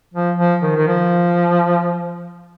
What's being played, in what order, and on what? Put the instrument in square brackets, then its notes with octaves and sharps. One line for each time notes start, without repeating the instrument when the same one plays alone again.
[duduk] F3
F3
D#3
D#3
F3